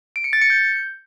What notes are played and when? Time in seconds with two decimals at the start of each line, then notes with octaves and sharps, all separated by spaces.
0.16 D7
0.24 C#7
0.33 A6
0.41 C#7
0.50 G6